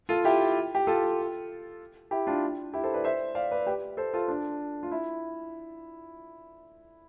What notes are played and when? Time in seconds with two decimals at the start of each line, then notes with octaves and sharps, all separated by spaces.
0.09 F4 A4
0.24 E4 G4
0.75 G4
0.87 F4 A4
2.11 E4 G4
2.27 D4 F4
2.73 E4 G4
2.84 A4 C5
2.94 B4 D5
3.04 C5 E5
3.35 D5 F5
3.51 B4 D5
3.66 G4 B4
3.97 A4 C5
4.14 F4 A4
4.28 D4
4.83 F4
4.91 E4